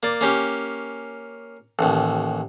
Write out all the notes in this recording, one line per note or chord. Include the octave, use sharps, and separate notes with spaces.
A#3 D5
A#3 C#4 G4
A1 D#2